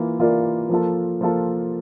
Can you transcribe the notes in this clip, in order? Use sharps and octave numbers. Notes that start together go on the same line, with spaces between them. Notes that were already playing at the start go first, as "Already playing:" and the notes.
Already playing: E3 A#3 F4
E3 A#3 F4 A#4 D5
F3 A#3 F4 A4
F3 A#3 F4 A4